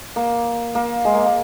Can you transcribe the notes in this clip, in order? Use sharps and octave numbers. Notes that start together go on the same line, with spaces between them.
A#3
A#3
G#3
A#3
A#3